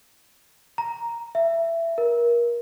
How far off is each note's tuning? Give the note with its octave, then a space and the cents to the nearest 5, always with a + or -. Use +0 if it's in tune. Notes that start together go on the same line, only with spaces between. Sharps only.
A#5 +0
E5 +15
A#4 +30